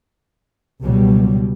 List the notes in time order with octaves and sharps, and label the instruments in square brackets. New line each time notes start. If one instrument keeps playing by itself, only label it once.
[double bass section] C#2 B2 F#3 G3